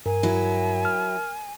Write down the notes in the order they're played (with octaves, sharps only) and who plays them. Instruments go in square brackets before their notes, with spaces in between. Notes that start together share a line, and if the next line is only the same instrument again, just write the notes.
[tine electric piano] G2 [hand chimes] A#4 [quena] G#5
[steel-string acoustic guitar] F#3 E4
[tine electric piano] F6